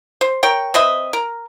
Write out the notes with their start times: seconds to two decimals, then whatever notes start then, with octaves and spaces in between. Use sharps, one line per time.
0.21 C5
0.43 A#4 C#5 G5
0.74 C4 B4 D#5 E5
1.13 A#4